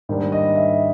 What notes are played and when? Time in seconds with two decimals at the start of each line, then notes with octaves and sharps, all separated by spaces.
0.09 G#2 D#3 G3 A#3 D4
0.32 D#5
0.56 E5